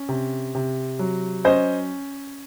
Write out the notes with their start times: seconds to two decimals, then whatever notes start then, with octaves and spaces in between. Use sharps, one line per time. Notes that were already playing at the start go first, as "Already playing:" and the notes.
Already playing: C#4
0.09 C3
0.55 C3
0.99 F#3
1.44 C#4 C5 D#5